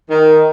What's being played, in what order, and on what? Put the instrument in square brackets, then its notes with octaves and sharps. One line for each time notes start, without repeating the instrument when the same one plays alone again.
[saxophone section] D#3